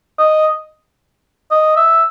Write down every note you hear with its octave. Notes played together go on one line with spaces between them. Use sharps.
D#5
D#5
E5